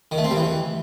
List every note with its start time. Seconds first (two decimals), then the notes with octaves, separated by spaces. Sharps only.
0.11 D#3
0.18 A3
0.24 C4
0.30 G3
0.37 E3